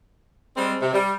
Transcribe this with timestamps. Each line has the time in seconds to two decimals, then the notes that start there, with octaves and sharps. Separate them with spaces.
0.56 G3 G#3 C4
0.81 C3
0.94 G3